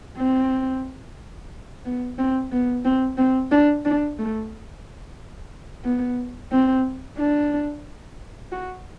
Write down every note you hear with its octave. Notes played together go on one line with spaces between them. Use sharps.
C4
B3
C4
B3
C4
C4
D4
D4
A3
B3
C4
D4
F#4